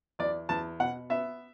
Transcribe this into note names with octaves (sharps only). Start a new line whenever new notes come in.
E2 D5
E2 A5
B2 F#5
B3 E5